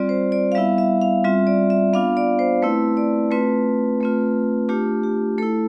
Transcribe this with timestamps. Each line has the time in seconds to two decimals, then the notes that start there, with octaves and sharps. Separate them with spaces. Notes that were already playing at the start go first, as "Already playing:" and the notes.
Already playing: G3 C4 F4 D5
0.09 C5
0.32 D5
0.52 F5
0.55 G3 B3 E4 E5
0.78 E5
1.01 F5
1.24 G3 C4 F4 E5
1.47 D5
1.70 E5
1.93 B3 D4 F4 F5
2.17 D5
2.39 C5
2.62 A3 C4 E4 B4
2.97 D5
3.31 A3 C4 F4 B4
4.01 A3 C4 F4
4.69 A3 D4 F4 G4
5.03 G4
5.38 A3 E4 A4